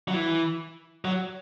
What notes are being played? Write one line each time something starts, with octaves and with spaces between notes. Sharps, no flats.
F#3
E3
F#3